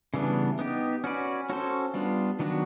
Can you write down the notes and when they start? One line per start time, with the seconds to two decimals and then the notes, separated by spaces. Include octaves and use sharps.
0.14 C#3 E3 G3 B3 D4
0.59 B3 D#4 G4
1.04 C#4 F#4 B4 D5
1.49 C#4 F#4 A4 C5
1.94 G3 B3 D4 F4
2.39 D#3 F#3 B3 D4 F#4